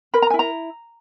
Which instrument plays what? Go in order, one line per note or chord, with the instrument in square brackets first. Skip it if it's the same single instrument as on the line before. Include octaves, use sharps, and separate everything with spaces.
[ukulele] A#4 B5
A#5
E4 G#5
A#5